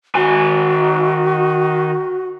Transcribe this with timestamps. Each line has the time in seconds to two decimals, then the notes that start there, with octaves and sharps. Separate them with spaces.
0.15 D#3 F#4 G#5